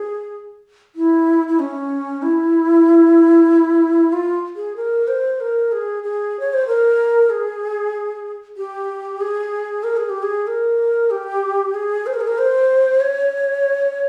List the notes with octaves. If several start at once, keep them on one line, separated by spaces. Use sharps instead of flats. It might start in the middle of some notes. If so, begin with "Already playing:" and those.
Already playing: G#4
E4
E4
C#4
E4
F4
G#4
A#4
C5
A#4
G#4
G#4
C#5
C5
A#4
G#4
G4
G#4
A#4
G#4
G4
G#4
A#4
G4
G#4
C5
A#4
G#4
A#4
C5
C#5